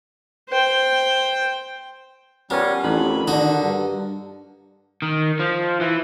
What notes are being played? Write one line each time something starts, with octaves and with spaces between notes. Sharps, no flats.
C5 G5
G3 B3 C#4 F4 G4 A#4
A1 F2 D4 D#4 G#5 B5
D3 D#3 D4 F#4 D#5
G2
D#3
F3
E3